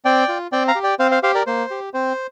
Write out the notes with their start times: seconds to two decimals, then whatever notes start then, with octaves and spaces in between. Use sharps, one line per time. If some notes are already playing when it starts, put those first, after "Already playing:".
0.05 C4 D5 G5
0.28 F4
0.52 C4 D5 G5
0.68 F5 A#5
0.75 G4
0.84 D5 G5
0.99 C4 C5 F5
1.11 C5 F5
1.23 G4 C5 F5
1.35 A#4 D5
1.47 A#3 C5
1.71 G4
1.94 C4 C5